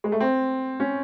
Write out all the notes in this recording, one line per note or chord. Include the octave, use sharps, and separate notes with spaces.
G#3
A3
C4
C#4